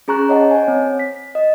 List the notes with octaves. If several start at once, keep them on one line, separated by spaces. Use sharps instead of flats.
C#4 G#4 A#5 C#6 F#6
C#5 D#5 F#5 A5
C#5 G#5
C4
B6
D#5